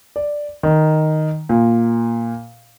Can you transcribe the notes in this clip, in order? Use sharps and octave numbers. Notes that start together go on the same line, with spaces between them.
D5
D#3
A#2